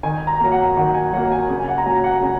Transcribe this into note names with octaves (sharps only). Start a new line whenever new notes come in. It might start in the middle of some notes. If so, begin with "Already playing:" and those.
D#3 G#5
A#5
F#3 A#3
F#5
D#3 F#5
G#5
F#3 A#3 F#5
G#5
C#3 G#5
G#5
F#5
A#5
F#3 A#3 G#5
F#5
C#3 G#5